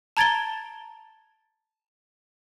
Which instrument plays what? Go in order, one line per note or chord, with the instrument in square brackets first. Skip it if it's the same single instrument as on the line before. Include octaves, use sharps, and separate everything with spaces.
[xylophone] A5 A#5 G#6 A6 D7 G7